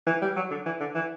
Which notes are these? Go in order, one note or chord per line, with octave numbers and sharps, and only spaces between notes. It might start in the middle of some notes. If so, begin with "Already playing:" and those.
E3
G3
F#3
D3
E3
D3
E3